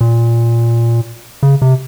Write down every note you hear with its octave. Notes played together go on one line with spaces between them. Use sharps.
A#2
C#3
C3